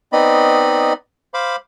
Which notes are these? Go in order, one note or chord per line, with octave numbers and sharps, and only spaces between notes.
B3 C4 D#4 D5 D#5 B5
C5 F5 B5 D6